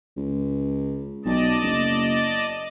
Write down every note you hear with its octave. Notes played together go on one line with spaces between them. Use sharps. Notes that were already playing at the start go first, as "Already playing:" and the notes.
C#2
B1 D5 D#5 A5
F#1